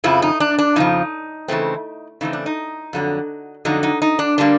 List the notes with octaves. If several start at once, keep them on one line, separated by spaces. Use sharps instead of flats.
F2 C#3 F3 E4
D#4
D4
D4
F2 C#3 F3 D#4
C#3 E3 A3 C4
C#3 E3 A3 C4 D#4
D4
D#4
F2 D3 F#3
F2 D3 F#3 D#4
D#4
D#4
D4
D3 G3 A#3 D4